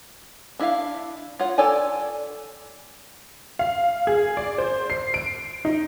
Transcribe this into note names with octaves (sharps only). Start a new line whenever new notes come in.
D4 E4 E5 F5
F4 C#5 F#5
A4 C#5 D5 G5 G#5
F5
G#4
D5
C5
C7
D7
D#4